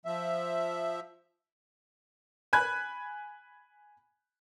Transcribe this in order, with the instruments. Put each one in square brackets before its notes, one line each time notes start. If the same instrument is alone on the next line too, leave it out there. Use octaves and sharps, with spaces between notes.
[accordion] F3 E5
[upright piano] G#5 B5 F#6 G#6